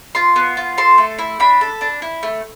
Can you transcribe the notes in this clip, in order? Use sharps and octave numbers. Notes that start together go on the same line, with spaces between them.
F4 C6
B3
F4
A4 C6
A3
E4
D4 B5
A4
D4
E4
A3